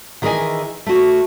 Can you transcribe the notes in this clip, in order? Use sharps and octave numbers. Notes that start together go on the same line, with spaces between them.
D#3 E3 G#4 A#4 D#5 G#5
A3 F#4